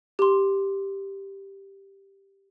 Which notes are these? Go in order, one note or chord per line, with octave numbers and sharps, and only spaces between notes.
G4 C6